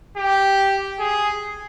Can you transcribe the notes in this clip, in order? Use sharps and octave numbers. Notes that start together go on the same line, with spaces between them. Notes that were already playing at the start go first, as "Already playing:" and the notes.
G4
G#4